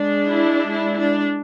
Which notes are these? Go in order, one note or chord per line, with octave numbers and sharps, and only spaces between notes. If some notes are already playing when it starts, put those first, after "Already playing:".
Already playing: G#3 D4
E4
E4
D4